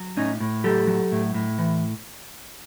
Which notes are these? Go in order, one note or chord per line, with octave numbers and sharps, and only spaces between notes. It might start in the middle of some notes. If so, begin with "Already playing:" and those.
Already playing: F#3
A2 C#4 D#4
A2
F#3 G4 A4
F#3
A2
A2
E3